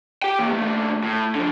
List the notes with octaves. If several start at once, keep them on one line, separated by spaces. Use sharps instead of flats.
G4 G5
E3 A#3
D#2 A3
A2
D3 F3